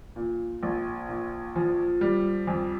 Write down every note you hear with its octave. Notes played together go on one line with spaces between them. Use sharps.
A#2
A#1
A#2
F3
G3
F2